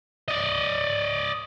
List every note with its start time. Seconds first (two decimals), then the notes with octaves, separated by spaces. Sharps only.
0.28 D5 D#5